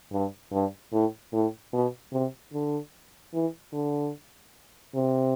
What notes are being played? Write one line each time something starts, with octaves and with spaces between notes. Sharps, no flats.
G2
G2
A2
A2
B2
C3
D3
E3
D3
C3